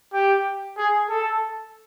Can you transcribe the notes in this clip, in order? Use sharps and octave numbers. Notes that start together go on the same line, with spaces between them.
G4
G#4
A4